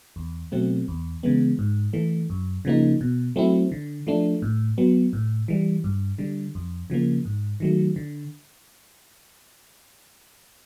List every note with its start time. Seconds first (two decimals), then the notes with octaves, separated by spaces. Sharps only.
0.16 E2
0.52 B2 F#3 A3 C4
0.88 E2
1.23 C#3 E3 G#3 B3
1.59 G#2
1.93 E3 A3
2.30 F#2
2.65 C#3 F3 A#3 D#4
3.01 B2
3.36 F#3 A3 C4 E4
3.72 D3
4.07 F3 A3 D4
4.42 A2
4.78 F#3 B3
5.13 A2
5.48 E3 G3
5.84 G2
6.18 D3 G3
6.55 F2
6.90 C#3 F3 A#3
7.25 G#2
7.60 D#3 F#3 A3
7.96 D3